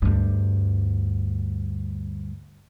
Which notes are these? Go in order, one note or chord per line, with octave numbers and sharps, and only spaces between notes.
D2 G2